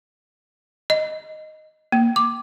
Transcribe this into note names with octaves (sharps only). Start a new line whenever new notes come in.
D#5
A#3
D6